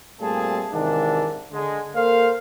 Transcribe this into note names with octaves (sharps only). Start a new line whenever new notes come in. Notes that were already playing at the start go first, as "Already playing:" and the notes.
A#2 G3 A3 C4 G#4 A5
G#2 C3 D#3 E3 D4
D3 G#3
A#3 A4 A#4 C5 F5